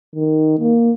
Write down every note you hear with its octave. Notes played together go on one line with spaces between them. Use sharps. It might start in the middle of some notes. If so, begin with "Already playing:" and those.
D#3
A#3